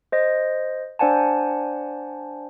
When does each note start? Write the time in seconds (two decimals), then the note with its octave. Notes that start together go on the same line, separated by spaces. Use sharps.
0.12 C5 D#5
0.99 D4 C5 D5 F#5 G#5 A5